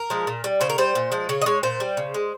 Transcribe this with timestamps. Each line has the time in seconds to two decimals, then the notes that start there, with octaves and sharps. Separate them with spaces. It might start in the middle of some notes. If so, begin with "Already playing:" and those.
Already playing: A#4
0.10 F3 G#3
0.27 A#2
0.44 G3
0.61 C#3 C5
0.70 A#4
0.78 G3 C5
0.95 A#2
1.12 F3 G#3
1.29 C#3 C#5
1.42 D#5
1.46 G#3 C#5
1.63 A#2 C5
1.80 G3
1.97 C#3
2.14 G#3